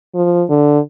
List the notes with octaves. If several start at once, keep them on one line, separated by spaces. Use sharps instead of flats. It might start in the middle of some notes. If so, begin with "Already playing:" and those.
F3
D3